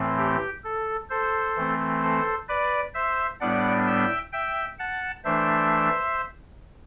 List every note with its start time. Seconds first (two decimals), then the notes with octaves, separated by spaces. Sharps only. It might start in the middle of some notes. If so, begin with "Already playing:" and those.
Already playing: A2 E3 A3 C4
0.18 G4
0.64 A4
1.10 A4 C5
1.56 E3 A3 C4
2.02 A4 C5
2.48 B4 D5
2.94 C5 E5
3.41 A2 G3 B3 D4 D5 F#5
3.87 E5 G5
4.32 E5 G5
4.79 F#5 A5
5.24 E3 A3 D4 C5 E5